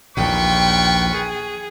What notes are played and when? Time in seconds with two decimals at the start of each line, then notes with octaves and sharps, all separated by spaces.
0.17 A#1 D#2 A#2 F4 B4 G5 C#6
1.12 G#4